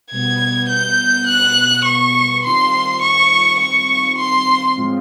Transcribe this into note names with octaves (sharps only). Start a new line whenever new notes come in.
B2 G3 B3 G#6
G6
F#6
C#6
D#3 G3 C4 F4 C6
C#6
C#6
C6
A2 F3 G#3 C4 F4